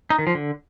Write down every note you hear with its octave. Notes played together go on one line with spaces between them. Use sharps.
D#4
D#3
F3
D3